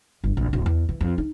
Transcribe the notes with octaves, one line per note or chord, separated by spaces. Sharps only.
G1
A#1
D1
E2
E3
F2
D#4